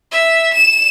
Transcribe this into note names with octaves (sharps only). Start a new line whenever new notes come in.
E5
E7